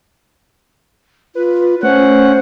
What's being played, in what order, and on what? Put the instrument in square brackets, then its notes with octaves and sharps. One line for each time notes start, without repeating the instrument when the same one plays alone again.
[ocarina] F4 [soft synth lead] B4
[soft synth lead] A3 [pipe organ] C#4 F#5 [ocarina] C5